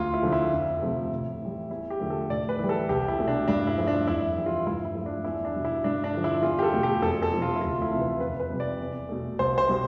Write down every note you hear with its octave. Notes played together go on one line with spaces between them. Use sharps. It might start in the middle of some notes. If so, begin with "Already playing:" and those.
Already playing: D2 F4
E4
D3 F3 A3
E4
F2
C3 F3 A3
A2
E3 G3
E2 E4
G4
D3 F3 A3
A4
A2 D5
B4
E3 G3
A4
C2 G4
E4
B2 A3
D4
G2 D4
E4
F3 A3
D4
F2 E4
E3 G3
F4
G2 E4
E4
F3 A3
D4
E2 E4
D4
B2 G3
E4
G2 D4
D4
D3 F3
E4
E2 F4
G4
A4
B2 A3
G4
F2 A4
A4
C3 F3 A3
F4
E4
D2 F4
E4
C3 E3
B4
F2 B4
B4
C3 G3
D5
E2
B2 A3
C2 C5
C5
B2 G3